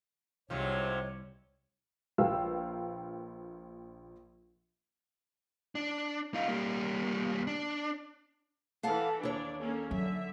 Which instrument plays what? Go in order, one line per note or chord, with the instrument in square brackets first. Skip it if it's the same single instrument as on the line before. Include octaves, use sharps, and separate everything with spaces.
[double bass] C2 [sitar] G#2 C3 F3 [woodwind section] C#5
[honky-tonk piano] A#1 A#4 B4 F5 G5 E6
[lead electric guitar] D4
D#4 F4
G3 A#3
D4
[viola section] E3 A4 [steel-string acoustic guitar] F5 F#5 A5
[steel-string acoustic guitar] D#2 C#5 [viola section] D4
[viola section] A#3 C#4 A4
[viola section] D3 E5 [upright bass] F#3